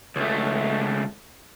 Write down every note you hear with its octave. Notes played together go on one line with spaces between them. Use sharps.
C#2 A3